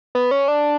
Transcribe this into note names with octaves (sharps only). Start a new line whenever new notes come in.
B3
C#4
D4